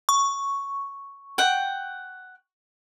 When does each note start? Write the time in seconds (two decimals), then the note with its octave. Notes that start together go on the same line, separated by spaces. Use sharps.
0.09 C#6
1.38 F#5 G5